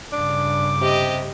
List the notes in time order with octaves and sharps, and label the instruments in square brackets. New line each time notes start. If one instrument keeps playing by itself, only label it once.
[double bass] G2 C#3 [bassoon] D4 [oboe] D6
[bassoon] C3 [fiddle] G4 D#5